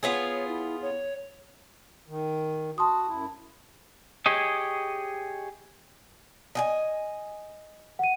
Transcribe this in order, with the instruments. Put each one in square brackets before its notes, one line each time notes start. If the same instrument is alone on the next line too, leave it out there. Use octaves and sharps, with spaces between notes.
[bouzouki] B3 F4 G#4 [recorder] C#5
[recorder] E4
C#5
[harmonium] D#3
[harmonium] F#4 [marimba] A5 C6 D#6
[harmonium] F#2 E4
[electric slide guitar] G4 G#4 C#5 D#5
[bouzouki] D#5 G5 G#5
[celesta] F#5 D#7